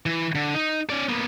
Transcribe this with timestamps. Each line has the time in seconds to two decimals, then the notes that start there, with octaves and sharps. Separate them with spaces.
0.06 E3
0.35 D3
0.54 D#4
0.90 C#4 D5
1.09 A#3 B3